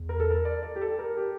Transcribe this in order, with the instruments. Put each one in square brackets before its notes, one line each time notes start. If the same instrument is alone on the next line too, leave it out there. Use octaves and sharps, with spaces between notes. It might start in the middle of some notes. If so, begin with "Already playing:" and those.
Already playing: [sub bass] E2
[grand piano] A#4
A4
A#4
D5
D5
G4
A4
A#4
G4